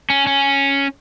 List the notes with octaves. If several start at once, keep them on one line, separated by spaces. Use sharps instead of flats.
C#4
C#4